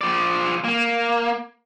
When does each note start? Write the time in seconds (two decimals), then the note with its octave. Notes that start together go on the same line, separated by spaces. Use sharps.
0.01 F3 D5
0.64 A#3